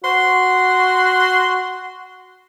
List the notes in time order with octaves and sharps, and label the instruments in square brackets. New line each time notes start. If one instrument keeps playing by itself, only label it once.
[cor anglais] F#4 [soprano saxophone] C6